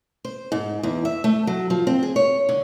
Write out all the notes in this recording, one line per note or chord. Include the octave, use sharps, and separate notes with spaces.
C5
G#2
E2
E5
A3
F#3
F3
C4
G#4
C#5
D3